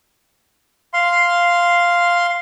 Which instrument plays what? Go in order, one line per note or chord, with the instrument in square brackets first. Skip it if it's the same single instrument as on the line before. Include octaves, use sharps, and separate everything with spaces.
[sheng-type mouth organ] F5 C6